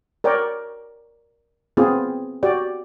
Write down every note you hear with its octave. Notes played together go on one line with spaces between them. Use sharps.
A#4 C#5 D5 G5
B3 C4 F4 G#4
F#4 G4 D5